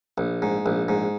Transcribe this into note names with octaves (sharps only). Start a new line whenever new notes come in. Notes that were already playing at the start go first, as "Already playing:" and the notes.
A#1
G#2
A#1
G#2